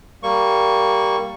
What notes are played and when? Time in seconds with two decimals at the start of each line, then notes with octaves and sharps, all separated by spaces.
0.23 G3 A#3 C#6